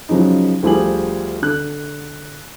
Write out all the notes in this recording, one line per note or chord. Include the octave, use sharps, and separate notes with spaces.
C#3 F3 F#3 G#3 D#4
D2 F3 G3 G#4 F#7
D3 F#6